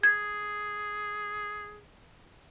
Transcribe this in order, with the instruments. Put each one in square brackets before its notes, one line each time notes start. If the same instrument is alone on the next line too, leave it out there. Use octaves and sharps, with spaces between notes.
[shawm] G#4 [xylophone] G#6